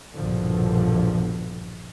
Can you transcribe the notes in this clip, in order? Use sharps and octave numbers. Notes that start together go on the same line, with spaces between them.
A#1 E2 G2 B2 D3 F3